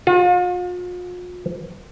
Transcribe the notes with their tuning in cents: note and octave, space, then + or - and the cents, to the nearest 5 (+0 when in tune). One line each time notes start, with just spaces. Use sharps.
F4 +45